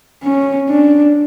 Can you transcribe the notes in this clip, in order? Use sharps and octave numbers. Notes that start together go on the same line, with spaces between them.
C#4
D4